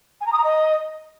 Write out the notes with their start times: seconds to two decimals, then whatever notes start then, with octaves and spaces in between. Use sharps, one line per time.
0.20 G#5
0.26 A#5
0.32 D#6
0.37 A#5
0.43 D#5